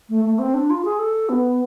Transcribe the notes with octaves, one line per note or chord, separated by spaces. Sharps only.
A3
A3
C4
D4
F4
G#4
A4
B3